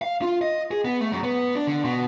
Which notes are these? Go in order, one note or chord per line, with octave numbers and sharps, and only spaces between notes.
F5
F4
D#5
G#4
B3
A3
F#2
B3
D4
D3
B2